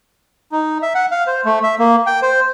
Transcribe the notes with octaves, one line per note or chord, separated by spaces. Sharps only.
D#4
E5
F#5
F5
C5
A3
E5
A#3
G5
C5